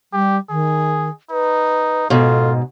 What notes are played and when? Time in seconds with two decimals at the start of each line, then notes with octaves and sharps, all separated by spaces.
0.13 G3 G4
0.50 D#3 G#4
1.31 D#4 B4
2.10 G#2 B2 F4 A4